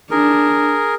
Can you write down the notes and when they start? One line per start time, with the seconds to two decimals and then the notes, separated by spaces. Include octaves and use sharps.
0.11 D4 G#4 A#4